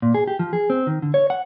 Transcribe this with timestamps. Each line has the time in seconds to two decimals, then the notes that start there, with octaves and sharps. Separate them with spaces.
0.02 A#2
0.14 G#4
0.28 G4
0.39 F3
0.53 G#4
0.70 C4
0.87 D#3
1.02 D3
1.14 C#5
1.30 F#5